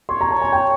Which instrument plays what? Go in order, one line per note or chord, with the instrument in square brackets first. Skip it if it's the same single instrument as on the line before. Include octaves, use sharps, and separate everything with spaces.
[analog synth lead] C#5 [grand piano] C6
[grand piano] A#5
[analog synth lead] C#5 [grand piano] A5
[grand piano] G#5
G5